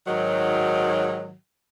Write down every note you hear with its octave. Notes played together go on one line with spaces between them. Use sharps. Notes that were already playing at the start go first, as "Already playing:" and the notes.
G#2 D#3 F#3